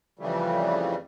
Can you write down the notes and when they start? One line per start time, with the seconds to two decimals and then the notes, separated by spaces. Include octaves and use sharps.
0.19 F2 C#3 E3 G3 A3